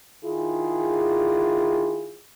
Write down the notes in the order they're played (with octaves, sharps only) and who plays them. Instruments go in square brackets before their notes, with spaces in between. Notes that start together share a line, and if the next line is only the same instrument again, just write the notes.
[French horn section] D#3 E4 F4 G#4